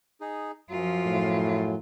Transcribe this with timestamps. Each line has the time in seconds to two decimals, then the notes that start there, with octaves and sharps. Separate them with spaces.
0.21 D#4 G#4
0.70 F#2 F3 F#3 F4
1.06 A2